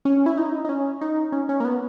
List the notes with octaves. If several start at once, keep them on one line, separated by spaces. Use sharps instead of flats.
C#4
E4
D#4
D#4
C#4
D#4
C#4
C#4
A#3
B3